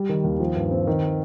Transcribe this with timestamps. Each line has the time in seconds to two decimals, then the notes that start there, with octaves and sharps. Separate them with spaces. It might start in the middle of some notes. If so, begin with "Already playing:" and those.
Already playing: G3
0.09 D#3
0.24 D#2
0.40 F3
0.56 G2
0.71 C4
0.87 D#3